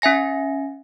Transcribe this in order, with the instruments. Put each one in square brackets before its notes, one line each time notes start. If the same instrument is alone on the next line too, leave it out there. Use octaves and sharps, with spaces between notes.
[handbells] C#4 E5 G#5 A#6